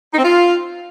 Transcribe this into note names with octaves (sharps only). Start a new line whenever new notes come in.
D#4
C4
F4